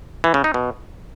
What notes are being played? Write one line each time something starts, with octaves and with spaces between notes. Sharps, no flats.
E3
C#3
D#4
B2